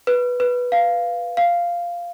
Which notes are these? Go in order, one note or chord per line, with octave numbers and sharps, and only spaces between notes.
B4
B4
F5
F5